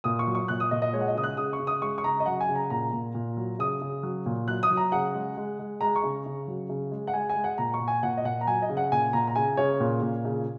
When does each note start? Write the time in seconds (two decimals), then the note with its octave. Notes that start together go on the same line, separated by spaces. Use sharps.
0.04 A#2 D#6
0.19 C#6
0.27 F#3
0.35 C#6
0.48 A#2 F#6
0.60 D#6
0.71 A#2 D#5
0.82 D#5
0.93 G#3 C#5
1.01 F#5
1.08 D#5
1.15 C#3 D#6
1.23 F#6
1.37 C#3 D#6
1.53 C#6
1.59 C#3
1.67 D#6
1.82 G#3 C#6
1.98 C#6
2.04 C#3 A#5
2.20 D#5
2.26 F#3 F#5
2.41 G#5
2.49 C#3
2.56 A#5
2.70 A#2 A#5
2.93 A#2
3.15 A#2
3.37 F#3
3.59 C#3 D#6
3.81 C#3
4.03 F#3
4.26 A#2
4.48 F#3 F#6
4.63 D#6
4.70 F#3
4.77 A#5
4.92 C#3 F#5
5.15 G#3
5.37 G#3
5.59 G#3
5.81 G#3 A#5
5.96 C#6
6.03 C#3
6.26 C#3
6.48 F#3
6.69 C#3
6.91 G#3
7.07 F#5
7.14 G#3 G#5
7.29 G#5
7.36 G#3
7.44 F#5
7.58 A#2 A#5
7.74 C#6
7.80 A#2
7.88 G#5
8.03 A#2 F#5
8.17 D#5
8.25 A#2 F#5
8.41 A#5
8.47 F#3 G#5
8.62 D#5
8.69 C#3
8.77 F#5
8.92 A#2 G#5
9.13 A#2 A#5
9.27 A#5
9.36 C#3 G#5
9.57 C#3 C#5
9.80 A#2
10.02 A#2
10.25 C#3